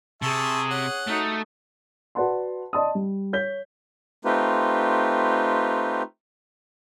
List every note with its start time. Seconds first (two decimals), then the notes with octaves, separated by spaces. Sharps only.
0.22 C3 G#4 E5 A5 C#6
0.71 C#4 F#5
1.07 A3 D#4 F#4
2.15 F#4 B4 D5 F#5 A5 C6
2.73 D5 D#5 A5 C6 D#6
2.95 G3
3.33 C#5 G6 B6 G7
4.25 A3 C4 D#4 F4 G4 B4